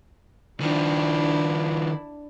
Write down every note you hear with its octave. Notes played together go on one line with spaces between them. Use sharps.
D#3 F3 D4 E4